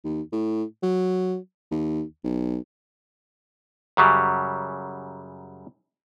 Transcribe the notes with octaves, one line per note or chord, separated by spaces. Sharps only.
D#2
A2
F#3
D#2
B1
F#2 C#3 F#3 G3